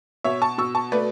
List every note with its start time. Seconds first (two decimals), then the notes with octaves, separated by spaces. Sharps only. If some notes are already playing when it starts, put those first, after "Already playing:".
0.24 B2 C#5 E5
0.42 A5 C#6
0.58 B2 C#6 E6
0.75 A5 C#6
0.92 A3 B4 D5